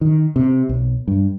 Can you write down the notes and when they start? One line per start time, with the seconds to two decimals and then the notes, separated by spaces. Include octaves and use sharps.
0.01 D#3
0.36 C3
0.69 B1
1.08 G2